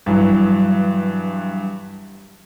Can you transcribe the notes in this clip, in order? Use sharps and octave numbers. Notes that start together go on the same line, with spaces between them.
G2 E3 F#3